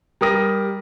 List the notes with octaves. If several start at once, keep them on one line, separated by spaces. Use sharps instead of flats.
G3 A#4 D#6 A#6